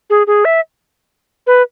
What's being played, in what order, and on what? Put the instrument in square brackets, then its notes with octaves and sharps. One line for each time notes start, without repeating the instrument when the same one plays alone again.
[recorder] G#4
G#4
E5
B4